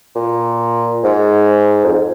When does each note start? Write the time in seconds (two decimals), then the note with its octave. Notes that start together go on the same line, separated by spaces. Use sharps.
0.15 A#2
1.04 G#2
1.84 F2